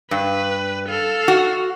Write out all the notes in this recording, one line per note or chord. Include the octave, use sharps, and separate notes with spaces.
G2 B4
A4 F5
F#4